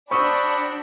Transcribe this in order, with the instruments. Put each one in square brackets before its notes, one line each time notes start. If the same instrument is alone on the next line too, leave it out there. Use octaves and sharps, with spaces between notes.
[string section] D4 [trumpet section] F#4 G5 B5 [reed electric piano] C5 D#6 E6 [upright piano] C#6